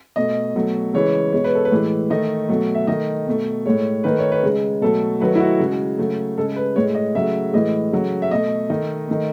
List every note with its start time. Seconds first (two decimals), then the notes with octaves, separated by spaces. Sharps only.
0.16 B2 A3 D#5
0.55 B2 F#3 A3
0.94 C#3 E3 G#3 C#5
1.33 B2 G#3 C#5
1.44 B4
1.55 A4
1.65 B4
1.72 A2 E3 G#3
2.10 D#3 A3 D#5
2.49 B2 F#3 A3
2.75 E5
2.87 D#3 A3 D#5
3.27 B2 A3
3.66 A2 G#3 C#5
4.04 D#3 A3 B4
4.19 C#5
4.32 B4
4.43 C#3 G#3
4.81 B2 F#3 A3 A4
5.20 D#3 F#3 A3 B4
5.35 E4
5.40 F#4
5.60 C#3 G#3
5.98 C#3 F#3 A3
6.38 C#3 G#3 A4
6.56 B4
6.76 A2 G#3 C#5
6.95 D#5
7.15 C#3 F#3 A3 E5
7.53 A2 E3 G#3 D#5
7.92 C#3 F#3 A3
8.22 E5
8.31 B2 A3 D#5
8.70 D#3 A3 D#5
9.08 D#3 A3